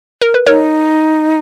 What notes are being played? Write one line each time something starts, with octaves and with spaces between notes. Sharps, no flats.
A#4
B4
D#4 A#4 C#5